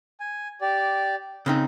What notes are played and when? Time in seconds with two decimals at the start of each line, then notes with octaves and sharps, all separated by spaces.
0.20 G#5
0.61 G4 D5
1.46 C#3 C4 D#4 F#6